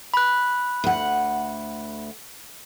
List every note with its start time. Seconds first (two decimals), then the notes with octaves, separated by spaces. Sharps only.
0.14 B5 F#6
0.84 D2 F#5